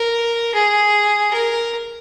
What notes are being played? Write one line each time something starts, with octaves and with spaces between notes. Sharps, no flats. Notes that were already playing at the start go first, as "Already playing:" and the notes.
Already playing: A#4
G#4
A#4